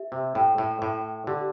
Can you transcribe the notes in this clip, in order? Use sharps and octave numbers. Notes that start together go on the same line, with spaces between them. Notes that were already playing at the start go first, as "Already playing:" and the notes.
Already playing: G4 E5
C3
A2 G5
A2
A2 D6
D3 G4